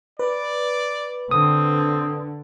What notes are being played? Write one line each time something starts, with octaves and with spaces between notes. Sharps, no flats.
B4 D5
D3 C4 D#6